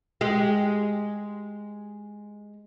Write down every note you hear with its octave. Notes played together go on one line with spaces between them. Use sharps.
G#3 G4